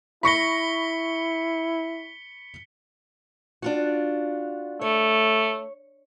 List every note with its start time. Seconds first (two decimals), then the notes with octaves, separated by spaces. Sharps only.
0.23 E4 B5 C#6 A#6 B6 C#7 G7
3.62 D4 F4 F#4
4.81 A3 C#5